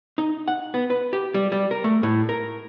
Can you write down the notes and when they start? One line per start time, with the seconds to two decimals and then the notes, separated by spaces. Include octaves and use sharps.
0.18 D#4
0.48 F#5
0.74 B3
0.90 B4
1.13 G4
1.34 G3
1.52 G3
1.71 A#4
1.84 A3
2.03 A2
2.29 A#4